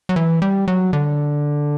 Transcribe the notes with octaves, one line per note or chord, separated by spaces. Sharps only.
F#3
E3
G3
F#3
D3